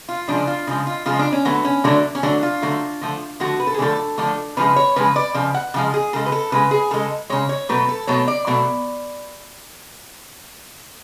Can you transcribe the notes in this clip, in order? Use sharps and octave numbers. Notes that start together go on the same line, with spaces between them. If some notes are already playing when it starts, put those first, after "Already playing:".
F4
C#3 F3 G#3 D4
F4
C#3 F3 G#3
F4
C#3 F3 G#3 F4
D4
C#4
D3 F#3 A3 B3
C#4
D3 F#3 A3 D4
C#4
D3 F#3 A3 D4
F4
D3 F#3 A3
D3 F3 A3
D3 F3 A3 F#4
B4
A4
G#4
D3 F3 A3 A4
D3 F3 A3
C#3 F3 G#3 B4
C#5
C#3 F3 G#3 B4
D5
C#3 F3
F#5
C#3 F3 G#3
G#4
C#3 G#3 A4
B4
A4
C#3 G#3 B4
G#4
C#3 G#3 A4
C#3 G#3 C#5
C#5
B2 F#3 A3 B4
A4
B2 F#3 A3 C#5
D5
B2 F#3 A3